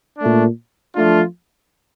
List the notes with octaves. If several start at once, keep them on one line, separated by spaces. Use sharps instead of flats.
A#2 A3 D4
F3 A3 D4 F4